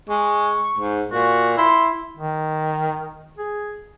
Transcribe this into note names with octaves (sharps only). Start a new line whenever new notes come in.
G#3 C#6
G#2
A#2 F#4
E4 C6
D#3
G#4